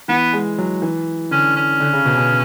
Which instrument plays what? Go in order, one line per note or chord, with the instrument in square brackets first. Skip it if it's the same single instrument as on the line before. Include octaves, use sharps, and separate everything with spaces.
[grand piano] E3 [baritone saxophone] B3
[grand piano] G#3
F#3
E3
[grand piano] D3 [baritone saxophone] C#4
[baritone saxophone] C#4
[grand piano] D3
C#3
B2
B2